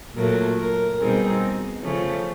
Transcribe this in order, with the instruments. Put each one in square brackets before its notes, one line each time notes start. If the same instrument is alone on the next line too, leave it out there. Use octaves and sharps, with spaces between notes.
[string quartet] A#2 F#3 A3 [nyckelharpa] A#4
[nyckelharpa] A#4
[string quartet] B2 G3 C4 D#4 G#4
C#3 F3 A3 C#4